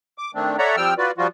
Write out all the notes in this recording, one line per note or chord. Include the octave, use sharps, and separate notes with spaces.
D6
D#3 A3 C4 D4
A4 C#5 D5 E5 F#5 A#5
F3 G3 C4 G5 E6 F6
F4 F#4 B4 D5
F3 G3 F4 F#4